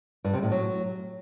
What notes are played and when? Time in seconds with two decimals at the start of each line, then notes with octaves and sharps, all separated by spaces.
0.24 G2
0.33 C3
0.43 A2
0.52 F#3